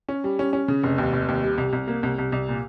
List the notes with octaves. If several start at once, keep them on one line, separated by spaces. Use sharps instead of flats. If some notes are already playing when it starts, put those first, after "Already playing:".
C#4
G3
C#4
C#4
C#3
F1
D#2
F1
D#2
G3
C2
C2
A#3
C2
C2
C2
A#2